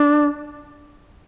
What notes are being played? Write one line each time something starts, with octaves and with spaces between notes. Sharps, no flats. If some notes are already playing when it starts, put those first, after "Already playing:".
Already playing: D4